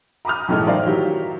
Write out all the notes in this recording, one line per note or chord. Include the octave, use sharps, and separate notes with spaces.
A#5 B5 D6 D#6 F6
B1 F#2 A2 E3 G#3 A3
D#4 A#4 C5 D5 E5 F5
D#3 F#3 E4 G4